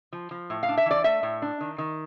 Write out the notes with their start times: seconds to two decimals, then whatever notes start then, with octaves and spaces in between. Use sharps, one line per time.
0.13 F3
0.31 F3
0.50 A2
0.63 F5
0.69 D4
0.77 E5
0.86 E3 D5
1.04 A3 E5
1.23 A2
1.42 D4
1.61 D#3
1.78 D#3